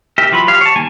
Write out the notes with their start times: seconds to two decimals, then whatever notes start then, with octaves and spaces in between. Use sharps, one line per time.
0.18 G4 A#4 E5
0.32 E3 F#3 F4 B5
0.48 G4 C#5 F5
0.61 C#5 A5
0.76 D#3 G3 A#3 G#5